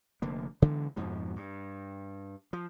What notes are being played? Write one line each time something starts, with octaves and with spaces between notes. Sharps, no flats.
F1 D3 A#3
C#3 E3 G#3 B3
F2 G#2 B2 F3
G2
F3